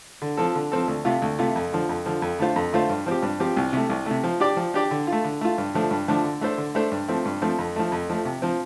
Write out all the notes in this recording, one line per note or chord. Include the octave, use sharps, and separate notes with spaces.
D3
F3 C4 A4
D3
F3 C4 A4
D2
C3 A3 F4
D2
C3 A3 F4
F2
D3 F3
F2
D3 F3
F2
D3 A3 F4 C5
F2
D3 A3 F4 C5
G2
F3 C4 G4
G2
F3 C4 G4
C2
C3 A3
C2
C3 A3
F3
D4 G4 D5
F3
D4 G4 D5
D3
F4
A3
D3
A3 F4
G2
D3 F3 A3 D4
G2
D3 F3 A3 D4
D3
A3 D4 A4 C5
D3
A3 D4 A4 C5
G2
F3 A3 C4
G2
F3 A3 C4
F2
F3 A3
F2
F3 A3
C3
F3 C4